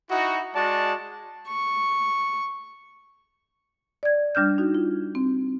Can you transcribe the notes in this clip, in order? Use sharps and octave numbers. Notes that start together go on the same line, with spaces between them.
D#4 E4 F#4
G#3 F#4 D5 A5
C#6
D5 G#6
G3 D4 F6 G6
D#4 F#4
F4
C4